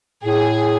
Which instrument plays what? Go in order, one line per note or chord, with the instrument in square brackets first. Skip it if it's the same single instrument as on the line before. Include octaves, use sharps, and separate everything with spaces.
[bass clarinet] A2 [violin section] G#4